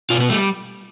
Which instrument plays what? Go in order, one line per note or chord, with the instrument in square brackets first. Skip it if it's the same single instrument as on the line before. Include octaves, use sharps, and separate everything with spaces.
[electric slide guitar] B2 F4
B3
G3 A3